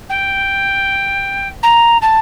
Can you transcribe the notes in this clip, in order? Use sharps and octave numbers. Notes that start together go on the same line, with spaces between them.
G5
A#5
A5